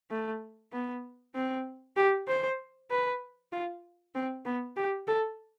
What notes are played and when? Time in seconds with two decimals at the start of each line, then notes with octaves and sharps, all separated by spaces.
0.11 A3
0.72 B3
1.35 C4
1.97 G4
2.28 C5
2.90 B4
3.52 F4
4.15 C4
4.46 B3
4.77 G4
5.08 A4